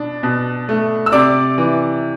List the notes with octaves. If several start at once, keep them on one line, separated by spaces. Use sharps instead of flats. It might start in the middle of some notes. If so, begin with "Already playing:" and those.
Already playing: B2 D4
B2
A3
E6
C3 D5 D6
E3